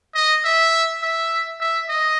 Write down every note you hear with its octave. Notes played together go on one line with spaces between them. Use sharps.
D#5
E5
E5
E5
D#5